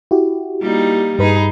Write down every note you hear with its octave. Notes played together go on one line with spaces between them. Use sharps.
E4 F#4 G4
G3 A#3 D#4
G2 D#4 G#4 B4 B5